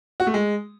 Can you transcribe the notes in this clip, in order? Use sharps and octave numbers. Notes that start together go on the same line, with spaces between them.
F#4
A3
G#3